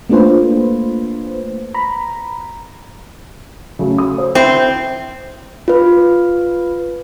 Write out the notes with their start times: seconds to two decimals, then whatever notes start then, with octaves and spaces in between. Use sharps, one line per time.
0.10 A3 A#3 D4 F4 B4 C5
1.74 A#5 B5
3.79 C#3 F#3 A3
3.98 D#6
4.18 C5
4.35 C4 E4
5.68 F4 B4